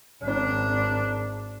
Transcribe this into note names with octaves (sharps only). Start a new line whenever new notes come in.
G#1 D4